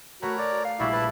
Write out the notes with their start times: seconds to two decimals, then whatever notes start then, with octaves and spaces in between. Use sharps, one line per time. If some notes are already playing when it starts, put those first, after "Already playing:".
0.22 A3 F#4 A#4 B4 C#5 F#5 A#5
0.38 D5
0.65 F5
0.80 A#1 G3 E4 F#4 D5
0.92 B4 A5